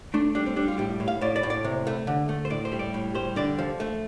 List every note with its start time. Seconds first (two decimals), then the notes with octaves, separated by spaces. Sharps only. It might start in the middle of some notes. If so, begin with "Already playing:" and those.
0.14 A3 D4
0.35 G3 D4
0.46 C4
0.56 G3 D4
0.68 F4
0.78 A2 G4
1.00 A2
1.08 F5
1.21 A2 D5
1.36 D5
1.43 A2
1.50 D5
1.64 C3
1.87 A3
2.07 D3
2.29 A3
2.45 C5
2.50 A2 D5
2.65 C5
2.72 G3
2.79 D5
2.94 A2
3.15 G3 C5
3.36 D3 D5
3.59 F3
3.80 A3